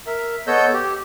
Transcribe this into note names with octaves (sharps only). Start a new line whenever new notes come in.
A#4 E5
B3 A4 C#5 D#5 E6 G6
G4